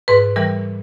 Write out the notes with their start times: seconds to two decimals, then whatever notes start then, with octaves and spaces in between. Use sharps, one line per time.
0.08 G#2 B4
0.36 E3 G3 A#4